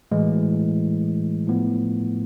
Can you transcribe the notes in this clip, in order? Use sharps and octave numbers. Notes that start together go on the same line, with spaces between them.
A2 E3 G#3
A2 F3 B3